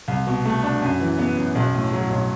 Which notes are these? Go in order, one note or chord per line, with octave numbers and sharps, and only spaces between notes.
C2
B2
A3
D4
F#2
E3
B3
F#2
B1
A2
F#3
B1